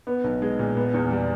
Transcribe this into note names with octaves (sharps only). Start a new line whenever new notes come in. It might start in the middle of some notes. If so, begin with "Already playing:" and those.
B3
B1
G#3
A#2
B3
E2
G3